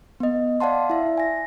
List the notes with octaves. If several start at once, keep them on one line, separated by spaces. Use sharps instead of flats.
B3 D#5
D5 F5 F#5 A5 C6
E4 E5
G#5 A#6